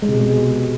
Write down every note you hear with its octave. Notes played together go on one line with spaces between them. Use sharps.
G#3
C3
B2
G#3